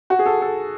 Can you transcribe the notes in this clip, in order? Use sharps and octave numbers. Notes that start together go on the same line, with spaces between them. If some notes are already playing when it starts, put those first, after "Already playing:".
F#4
G#4
A4
A4